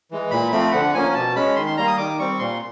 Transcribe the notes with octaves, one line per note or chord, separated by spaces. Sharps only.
E3 G#3
A#2 B5
F3 A3 C4 B5
D3 F#5
F3 A#3 C#4 G#5
B2 A5
G#3 C#4 B5
D#3 C6
C6
G3 A#3 A#5
D#6
D#3 D6
G3 C4 C#6
A#2 C6